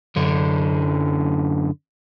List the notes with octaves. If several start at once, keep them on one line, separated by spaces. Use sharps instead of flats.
F#2 D3